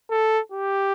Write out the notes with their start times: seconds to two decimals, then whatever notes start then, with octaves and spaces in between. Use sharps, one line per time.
0.10 A4
0.52 G4